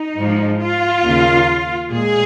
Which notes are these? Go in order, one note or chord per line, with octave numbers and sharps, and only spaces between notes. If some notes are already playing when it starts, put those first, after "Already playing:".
Already playing: D#4
G#2 F3 G#3
F4
D#2 C#3 A#3
A#2 G#3 G#4